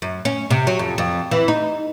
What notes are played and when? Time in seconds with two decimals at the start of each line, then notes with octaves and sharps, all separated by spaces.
0.02 F#2
0.25 C#4
0.50 C3
0.67 F#3
0.79 F2
0.98 F2
1.31 E3
1.48 D#4